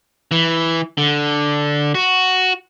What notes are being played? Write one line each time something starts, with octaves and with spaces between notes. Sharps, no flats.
E3
D3
F#4